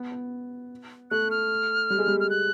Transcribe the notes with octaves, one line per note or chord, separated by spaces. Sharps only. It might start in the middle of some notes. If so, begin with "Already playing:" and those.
Already playing: B3
B3
A3 F#6
F6
G3
G#3
G3
F6
F#6